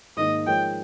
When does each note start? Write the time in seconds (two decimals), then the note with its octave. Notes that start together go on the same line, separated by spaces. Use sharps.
0.16 G#2 D#3 A#3 D#4 D#5
0.46 F3 G#3 D#4 A#4 C#5 G5